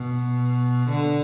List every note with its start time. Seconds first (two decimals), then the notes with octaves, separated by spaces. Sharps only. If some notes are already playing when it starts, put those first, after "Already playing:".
Already playing: B2
0.89 D3